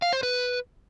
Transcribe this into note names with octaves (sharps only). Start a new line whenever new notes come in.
F5
C5
B4